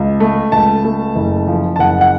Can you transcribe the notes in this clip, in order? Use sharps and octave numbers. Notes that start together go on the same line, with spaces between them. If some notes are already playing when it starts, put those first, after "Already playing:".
Already playing: C#2
A3
C#2 A5
A3
F#1
F3
A5
F#1 F#5
F#5